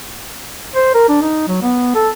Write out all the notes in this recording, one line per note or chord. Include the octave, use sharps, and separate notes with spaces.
C5
A#4
D4
D#4
F#3
B3
A4